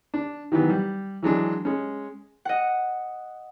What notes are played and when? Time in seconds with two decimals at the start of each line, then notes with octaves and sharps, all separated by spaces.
0.14 D4
0.52 D#3 E3 F#3 B3
0.70 G3
1.22 E3 F#3 G#3 D4
1.65 G#3 C#4
2.45 D#5 F#5